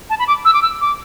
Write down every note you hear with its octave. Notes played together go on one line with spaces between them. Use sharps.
A5
B5
D6
E6
D6
E6
D6